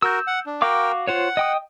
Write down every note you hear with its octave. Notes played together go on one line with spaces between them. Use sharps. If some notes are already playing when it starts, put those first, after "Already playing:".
F#4 A#4 E6 G6
F#5
D4
F#4 A#4 F5 G5 D6
F4 C5 C#5 F#5
D#5 G5 D#6